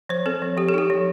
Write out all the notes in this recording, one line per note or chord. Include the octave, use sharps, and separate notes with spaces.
F3 C5
C4 A4
F3
F3 G4
A4
D#4 G4
F3